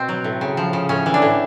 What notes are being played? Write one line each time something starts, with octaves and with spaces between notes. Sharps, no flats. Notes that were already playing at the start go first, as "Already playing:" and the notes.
Already playing: B2 C4
F#3
A2
C#3
F3
C#3
A2 C#4
E3
D4
A2